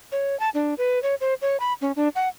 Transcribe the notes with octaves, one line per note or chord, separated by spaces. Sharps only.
C#5
A5
D4
B4
C#5
C5
C#5
B5
C#4
D4
F#5